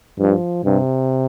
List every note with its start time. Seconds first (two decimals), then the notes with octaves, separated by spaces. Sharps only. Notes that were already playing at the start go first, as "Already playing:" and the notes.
0.19 G2 F3
0.64 G2 C3